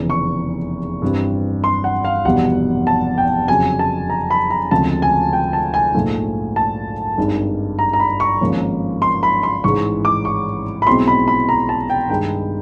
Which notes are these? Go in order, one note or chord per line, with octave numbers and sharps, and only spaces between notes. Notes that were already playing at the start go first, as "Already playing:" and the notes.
Already playing: F1 E2 C#3 E3
C#6
G2 E3 G3 C4
C6
F#5
F5
F1 E2 B2 G3 F#5
A5
G5
F2 C#3 F#3 G#5
A5
A#5
B5
A#5
D2 C#3 F3 G#3 C4 A5
G#5
G5
A5
G#5
A#1 G#2 F3 A3
A5
G#1 G2 D#3 G#3
A#5
A#5
B5
C#6
G#1 G#2 F3 A#3 C#4
C6
B5
C6
A1 G#2 E3 G#3 C#6
D6
C#6
B5
B1 B2 G#3 C4 E4 C6
B5
B5
A#5
A5
G5
G2 D#3 G#3 G5